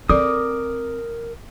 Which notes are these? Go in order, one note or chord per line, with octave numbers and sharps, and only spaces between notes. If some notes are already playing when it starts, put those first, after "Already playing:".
C4 A4 A#4 D5 D6 D#6